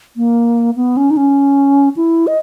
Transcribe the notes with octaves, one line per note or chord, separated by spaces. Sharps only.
A#3
B3
C#4
D#4
C#4
E4
D#5